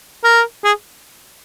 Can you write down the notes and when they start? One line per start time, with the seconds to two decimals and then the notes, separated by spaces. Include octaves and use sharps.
0.24 A#4
0.64 G#4